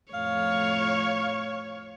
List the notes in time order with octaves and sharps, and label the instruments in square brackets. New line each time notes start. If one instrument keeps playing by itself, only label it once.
[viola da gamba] F2 A2 [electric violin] C#5 [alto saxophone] F5